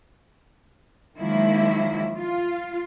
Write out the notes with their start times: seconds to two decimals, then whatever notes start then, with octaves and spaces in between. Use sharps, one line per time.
1.18 D#3 F3 F#3 G#3 A#3 E4
2.17 F4